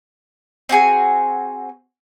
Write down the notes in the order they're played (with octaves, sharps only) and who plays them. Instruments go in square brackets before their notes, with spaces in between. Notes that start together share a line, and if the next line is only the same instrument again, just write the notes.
[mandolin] C4 F#4 G#4 G#5